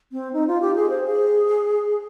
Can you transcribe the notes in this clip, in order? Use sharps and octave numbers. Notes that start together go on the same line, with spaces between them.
C4
D#4
F4
G4
G#4
C5
G#4